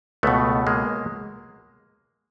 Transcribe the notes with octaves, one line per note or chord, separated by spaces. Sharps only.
C#2 B2 A3 B3
G#3 A#3